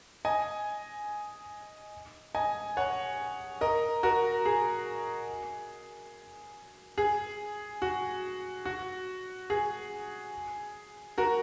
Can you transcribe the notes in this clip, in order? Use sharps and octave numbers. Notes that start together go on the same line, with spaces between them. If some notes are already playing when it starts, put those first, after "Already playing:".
D#5 G#5
D#5 G#5
C#5 F#5
A#4 D#5
F#4 A#4
G#4
G#4
F#4
F#4
G#4
F#4 A#4